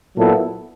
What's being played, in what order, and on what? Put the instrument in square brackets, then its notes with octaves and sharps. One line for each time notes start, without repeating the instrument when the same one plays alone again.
[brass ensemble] A#2 F#3 B3 E4 A4